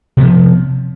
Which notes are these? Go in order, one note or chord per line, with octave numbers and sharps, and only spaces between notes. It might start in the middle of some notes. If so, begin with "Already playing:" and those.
C3 F3 B3